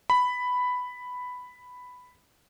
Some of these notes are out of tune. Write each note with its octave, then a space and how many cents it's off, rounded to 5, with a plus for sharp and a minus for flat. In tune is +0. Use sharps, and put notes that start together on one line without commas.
B5 +5